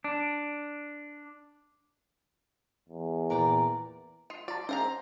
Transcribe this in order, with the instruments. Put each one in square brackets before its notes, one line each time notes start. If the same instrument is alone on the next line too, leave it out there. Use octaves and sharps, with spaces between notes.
[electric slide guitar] D4
[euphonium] E2
[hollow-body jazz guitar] A#2 E3 [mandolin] A#4 D5 G5
[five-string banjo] F4 [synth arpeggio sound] D#6 C7
[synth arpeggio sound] F4 A5 [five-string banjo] D5
[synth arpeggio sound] C#4 G#4 [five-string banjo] C5 F5 A#5